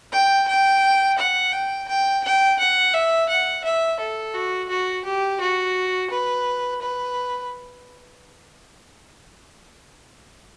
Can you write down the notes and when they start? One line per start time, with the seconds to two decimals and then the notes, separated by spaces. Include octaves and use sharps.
0.12 G5
0.48 G5
1.18 F#5
1.52 G5
1.88 G5
2.24 G5
2.59 F#5
2.94 E5
3.29 F#5
3.64 E5
4.00 A4
4.34 F#4
4.69 F#4
5.05 G4
5.41 F#4
6.10 B4
6.81 B4